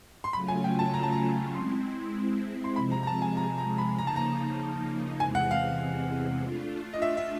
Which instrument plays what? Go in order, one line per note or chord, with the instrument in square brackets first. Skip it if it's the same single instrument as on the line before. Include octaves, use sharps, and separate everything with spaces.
[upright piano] C6
[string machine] C#3 F#3 A3 C#4 F4 [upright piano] B5
[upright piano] G#5
G5
A5
A#5
A5
A#5
[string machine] G#3 C4 E4 [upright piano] C6
[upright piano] C6
[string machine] C3 F3 G#3 [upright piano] B5
[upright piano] A#5
A#5
A5
G#5
A#5
A#5
B5
[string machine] C#3 F3 A#3 D#4 [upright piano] A#5
[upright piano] A5
A#5
[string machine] E2 C3 E3 G#3 C4 [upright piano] G#5
[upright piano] F#5
F5
[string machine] A3 D4 F4
[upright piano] D#5
E5
E5